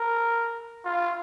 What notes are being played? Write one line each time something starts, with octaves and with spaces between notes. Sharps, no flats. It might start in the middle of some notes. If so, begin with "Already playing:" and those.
Already playing: A#4
F4